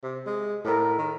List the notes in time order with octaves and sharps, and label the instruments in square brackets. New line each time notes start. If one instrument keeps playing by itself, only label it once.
[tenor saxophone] C3
G#3
[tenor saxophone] A2 [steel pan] A4 A#4
[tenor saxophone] D#3